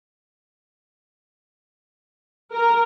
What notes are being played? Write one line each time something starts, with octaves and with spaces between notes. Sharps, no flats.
A#4